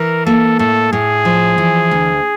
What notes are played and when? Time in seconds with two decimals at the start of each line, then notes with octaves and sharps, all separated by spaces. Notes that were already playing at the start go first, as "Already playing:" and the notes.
Already playing: E3 A#4
0.26 A#3 A4
0.59 A2 A4
0.92 A2 G#4
1.25 F3
1.58 E3
1.91 D2